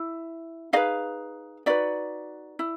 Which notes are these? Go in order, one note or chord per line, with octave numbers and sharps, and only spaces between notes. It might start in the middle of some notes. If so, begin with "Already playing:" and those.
Already playing: E4
D#4 G#4 B4 D#5 F5
D#4 F#4 B4 D5 E5
E4